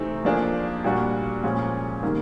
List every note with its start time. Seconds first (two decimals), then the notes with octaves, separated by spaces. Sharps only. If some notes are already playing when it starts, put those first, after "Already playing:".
Already playing: C3 E3 A3 C4 D#4
0.25 F3 A#3 D4 F4 G#4
0.84 A#2 G3 A#3 D4 F#4
1.43 A#2 F3 G#3 C#4 F4
2.03 C3 D#3 G3 A#3